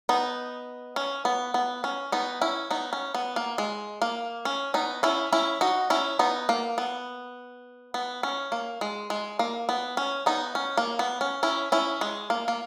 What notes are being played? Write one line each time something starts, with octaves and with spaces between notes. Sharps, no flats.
B3 D#4
C#4
B3
B3
C#4
B3 D#4
C#4 E4
B3 D#4
C#4
B3
A#3
G#3
A#3
C#4
B3 D#4
C#4 E4
C#4 E4
D#4 F#4
C#4 E4
B3 D#4
A#3
B3
B3
C#4
A#3
G#3
G#3
A#3
B3
C#4
B3 D#4
C#4
A#3
B3
C#4
C#4 E4
C#4 E4
G#3
A#3
A#3